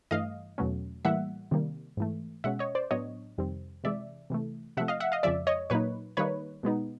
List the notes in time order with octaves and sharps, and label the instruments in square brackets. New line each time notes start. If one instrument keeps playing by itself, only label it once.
[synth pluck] G2 E3 A3 D#5 F5
E2 B2 F#3 A3 C#4
A2 E3 G3 A#3 E5 F#5
C3 D#3 G3 A#3
G#2 E3 A3
B2 G#3 C#4 E5 F#5
C#5 D#5
C5 D5
A2 F#3 B3 D4 C#5 D#5
F2 C3 D#3 G3 C4
C3 E3 G#3 D5 E5
C3 E3 A3
C3 F3 A3 E5 F#5
D#5 F5
E5 F#5
D#5 F5
F2 C#3 F3 G#3 D5 E5
C#5 D#5
A#2 F#3 A#3 D#4 B4 C#5
D#3 G3 A#3 D#4 B4 C#5
B2 G#3 B3 D#4